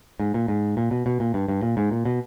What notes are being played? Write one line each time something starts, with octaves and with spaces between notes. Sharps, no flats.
G#2
A#2
G#2
A#2
B2
B2
A#2
G2
G2
A#2
G#2
A#2
B2